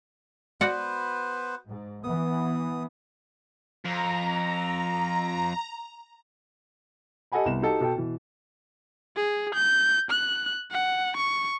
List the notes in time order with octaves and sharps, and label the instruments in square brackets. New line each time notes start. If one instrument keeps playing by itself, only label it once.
[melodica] B3 B4 C5 [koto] F#4 D5 F#5
[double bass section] G#2
[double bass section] E3 B3 [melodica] D#6
[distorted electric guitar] F2 [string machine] A#5
[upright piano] G4 A4 D#5 F#5 G#5 B5
C2 B3 E7
D#4 F#4 G4 A4
B2 A4 G5
B2 E3
[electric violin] G#4
G6
F#6
F#5
C#6